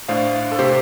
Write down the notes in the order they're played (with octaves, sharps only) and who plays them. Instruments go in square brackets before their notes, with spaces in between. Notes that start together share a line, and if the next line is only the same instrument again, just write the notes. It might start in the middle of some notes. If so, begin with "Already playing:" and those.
[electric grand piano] A2 A3 D4 C5 F5
A4
C3 A3 C4 G4 C5